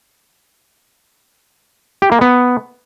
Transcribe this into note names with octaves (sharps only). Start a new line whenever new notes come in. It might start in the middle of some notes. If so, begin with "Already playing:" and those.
G4
A#3
B3